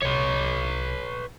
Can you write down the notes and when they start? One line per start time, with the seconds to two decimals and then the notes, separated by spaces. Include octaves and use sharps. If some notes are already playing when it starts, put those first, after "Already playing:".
0.02 C2 B4 C#5